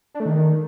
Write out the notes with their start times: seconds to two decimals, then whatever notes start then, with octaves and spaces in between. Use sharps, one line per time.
0.14 D4
0.20 A3
0.26 D#3